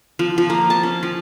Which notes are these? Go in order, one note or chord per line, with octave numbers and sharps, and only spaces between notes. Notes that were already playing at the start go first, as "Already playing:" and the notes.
F3
F3
A#3
A5
C#4
F3